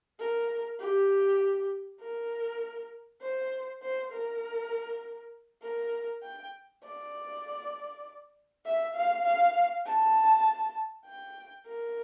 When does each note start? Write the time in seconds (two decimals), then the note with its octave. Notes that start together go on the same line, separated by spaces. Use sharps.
0.19 A#4
0.80 G4
2.00 A#4
3.21 C5
3.82 C5
4.11 A#4
5.62 A#4
6.22 G5
6.83 D5
8.65 E5
8.95 F5
9.24 F5
9.86 A5
11.05 G5
11.67 A#4